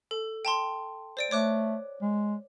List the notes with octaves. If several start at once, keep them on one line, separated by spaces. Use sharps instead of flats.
A4
G5 A5 C6
C5 D5 D7
A3 C#5 D6 F#6
G#3